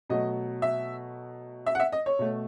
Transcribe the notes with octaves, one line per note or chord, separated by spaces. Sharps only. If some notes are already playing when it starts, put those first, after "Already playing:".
B2 F#3 A3 D#5
E5
E5
F#5
E5
D#5
C#5
B2 A3